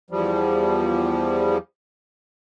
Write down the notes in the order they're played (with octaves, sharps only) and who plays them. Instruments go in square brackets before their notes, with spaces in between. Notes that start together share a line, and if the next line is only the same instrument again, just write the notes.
[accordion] E2 F3 G3